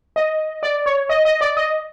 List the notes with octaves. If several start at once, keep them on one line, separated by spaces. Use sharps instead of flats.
D#5
D5
C#5
D#5
D#5
D5
D#5